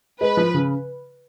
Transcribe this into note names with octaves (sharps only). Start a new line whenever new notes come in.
G#3 B4
F3
C#3